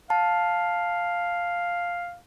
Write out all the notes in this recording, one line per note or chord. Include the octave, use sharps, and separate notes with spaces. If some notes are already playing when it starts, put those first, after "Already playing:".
F5 A5